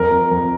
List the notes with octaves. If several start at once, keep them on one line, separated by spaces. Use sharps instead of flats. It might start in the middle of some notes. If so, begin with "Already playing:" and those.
Already playing: F2 A#4
F2
F2